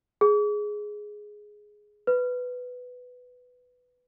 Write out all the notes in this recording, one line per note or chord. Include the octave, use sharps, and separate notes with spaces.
G#4
B4